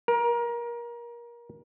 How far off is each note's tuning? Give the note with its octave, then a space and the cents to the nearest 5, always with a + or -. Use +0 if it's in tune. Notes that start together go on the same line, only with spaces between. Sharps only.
A#4 +25